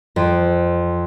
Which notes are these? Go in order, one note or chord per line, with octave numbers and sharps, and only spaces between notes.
F2